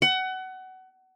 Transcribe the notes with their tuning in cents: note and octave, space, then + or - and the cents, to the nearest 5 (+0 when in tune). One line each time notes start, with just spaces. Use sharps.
F#5 +25